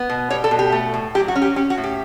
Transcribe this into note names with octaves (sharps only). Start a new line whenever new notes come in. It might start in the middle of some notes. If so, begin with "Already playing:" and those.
Already playing: B3
B2
G3 C#5
A4
B2
G4
A3
A2
F#3 G4
F#4
C#4
G4
C#4 G4
F#4
A2
G4